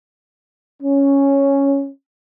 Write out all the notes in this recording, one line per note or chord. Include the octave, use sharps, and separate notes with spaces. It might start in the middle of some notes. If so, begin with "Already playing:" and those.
C#4